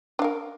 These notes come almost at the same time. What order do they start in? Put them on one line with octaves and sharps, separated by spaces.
D4 F5 A#4